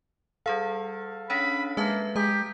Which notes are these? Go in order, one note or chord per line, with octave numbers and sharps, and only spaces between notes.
G3 G#4 A4 F5 F#5
C#4 D4 C#5 B5
G#3 A#3 B4 E5 A5
G#3 G4 A#5 D#6